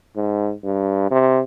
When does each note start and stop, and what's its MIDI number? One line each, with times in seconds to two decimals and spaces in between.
0.16 0.53 44
0.64 1.07 43
1.11 1.42 48